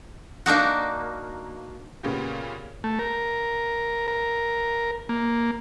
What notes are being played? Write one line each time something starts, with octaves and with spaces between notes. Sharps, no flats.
A#3 D4 D#4 F#4
A#2 C#3 B3 G4
A3
A#4
A#4
A#3